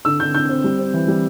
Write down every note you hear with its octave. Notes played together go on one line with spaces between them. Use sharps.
D3 E6
D3 G6
D3 G6
C4
G3
C4
E3
G3